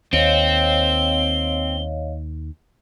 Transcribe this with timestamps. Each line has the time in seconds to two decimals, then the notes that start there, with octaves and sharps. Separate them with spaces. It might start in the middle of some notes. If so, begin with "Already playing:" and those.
0.13 D#2 C4 C#5 D#5 F5 G7